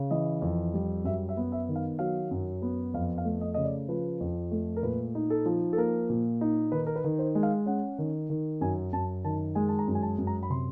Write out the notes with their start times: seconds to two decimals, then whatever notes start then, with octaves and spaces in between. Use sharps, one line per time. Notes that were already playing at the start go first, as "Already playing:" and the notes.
Already playing: C#3
0.11 E3 D#5
0.42 F2
0.74 G3
1.04 F#2 E5
1.29 E5
1.37 B3
1.52 E5
1.69 D#3
1.76 F5
1.99 F#3 F5
2.31 F#2
2.62 B3
2.94 F2 F5
3.18 F5
3.25 A3
3.41 D#5
3.54 C#3 D#5
3.65 D5
3.88 F3 B4
4.21 F2
4.51 A3
4.77 A#4
4.83 A#2 B4
5.15 D#4
5.30 A4
5.46 F3
5.73 A4
5.77 A#3 A#4
6.10 A#2
6.41 D#4
6.72 D#3 B4
6.87 A#4
6.96 B4
7.04 D#3
7.19 C5
7.35 G#3
7.43 F5
7.66 C#4 F#5
7.99 D#3
8.30 D#3
8.61 F#2 G#5
8.92 F#2 A5
9.24 D#3 A5
9.55 G#3 G#5
9.69 A5
9.79 A#5
9.88 F#2
9.95 G#5
10.02 A5
10.18 F#2
10.27 A#5
10.43 B5
10.50 C3 C6